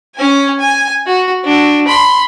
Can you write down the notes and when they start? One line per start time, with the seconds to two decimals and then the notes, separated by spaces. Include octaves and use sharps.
0.16 C#4 G#5
0.59 G#5
1.06 F#4
1.44 D4 F#4
1.88 B5 C6